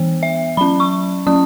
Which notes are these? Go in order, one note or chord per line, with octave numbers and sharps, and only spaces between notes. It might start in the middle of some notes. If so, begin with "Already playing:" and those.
Already playing: E3 B3
E5
F#3 C#4 B5
C#6
F#3 C#4 D#6